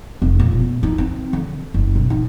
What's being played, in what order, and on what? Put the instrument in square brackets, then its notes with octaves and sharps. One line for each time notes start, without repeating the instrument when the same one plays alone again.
[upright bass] F1
A#2
B3
D#4
C4
D3
F#1
B1
D#4